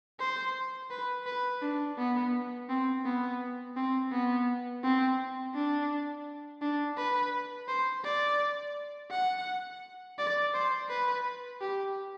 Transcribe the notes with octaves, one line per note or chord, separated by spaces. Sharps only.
C5
B4
B4
D4
B3
C4
B3
C4
B3
C4
D4
D4
B4
C5
D5
F#5
D5
C5
B4
G4